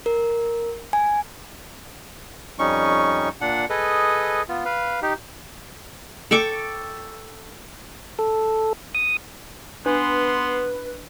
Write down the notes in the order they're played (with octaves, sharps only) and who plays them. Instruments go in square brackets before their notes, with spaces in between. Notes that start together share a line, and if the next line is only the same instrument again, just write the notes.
[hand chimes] A#4
G#5
[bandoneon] F2 G3 C#4 D#4 C#6
A#2 D4 F#5
G#4 A4 B4 D#5
B3 F4
B4 F5
D#4 G4
[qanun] A4 G5 C#6 D6
[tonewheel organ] A4
D#6
[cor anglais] B3 [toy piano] D4 [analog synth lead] B4 [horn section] C6